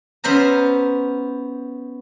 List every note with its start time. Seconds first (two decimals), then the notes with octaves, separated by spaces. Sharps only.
0.24 B3 C#4 C5 E5 A#5